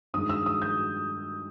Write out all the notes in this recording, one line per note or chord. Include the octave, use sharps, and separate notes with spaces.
G2 D#3 G#3 D#6
E6
D#6
G6